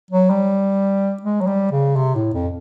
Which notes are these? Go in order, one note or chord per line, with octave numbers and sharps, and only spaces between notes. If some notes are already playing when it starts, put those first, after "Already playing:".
F#3
G3
G#3
F#3
G3
C#3
C3
A2
F2